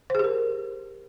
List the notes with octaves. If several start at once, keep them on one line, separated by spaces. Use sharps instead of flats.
G4 G#4 A#4 C5